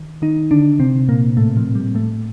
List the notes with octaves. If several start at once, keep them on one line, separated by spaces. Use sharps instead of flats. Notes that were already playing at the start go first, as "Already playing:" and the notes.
Already playing: D#3
D#3 D#4
D3 D4
C3 C4
A#2 A#3
A2 A3
F3
G3
A2 A3